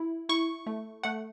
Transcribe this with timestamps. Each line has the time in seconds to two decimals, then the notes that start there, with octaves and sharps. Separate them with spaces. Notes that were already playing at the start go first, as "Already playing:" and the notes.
Already playing: E4
0.29 E4 C#6
0.67 A3
1.04 A3 F#5